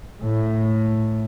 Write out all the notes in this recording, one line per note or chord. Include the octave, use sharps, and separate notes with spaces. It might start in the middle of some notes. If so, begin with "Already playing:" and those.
A2